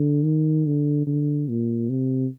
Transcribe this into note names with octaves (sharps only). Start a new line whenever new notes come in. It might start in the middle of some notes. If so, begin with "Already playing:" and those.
Already playing: D3
D#3
D3
D3
A#2
C3